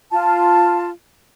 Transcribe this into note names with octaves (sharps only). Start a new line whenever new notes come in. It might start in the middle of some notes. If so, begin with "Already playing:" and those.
F4 A5